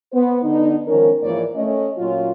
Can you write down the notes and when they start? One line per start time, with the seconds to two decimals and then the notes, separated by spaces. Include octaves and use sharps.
0.12 B3 C5
0.43 D3 B3 D4 D#4
0.87 D#3 F3 G#3 C#4 A#4
1.23 G#2 E3 F3 A#3 C#5 D5
1.54 A3 C#4 D#5
1.98 A#2 F#3 C#4 F4